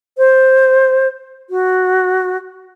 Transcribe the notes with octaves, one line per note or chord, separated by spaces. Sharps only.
C5
F#4